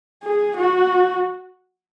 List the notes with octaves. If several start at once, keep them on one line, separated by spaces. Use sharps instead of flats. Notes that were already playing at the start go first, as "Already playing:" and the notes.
G#4
F#4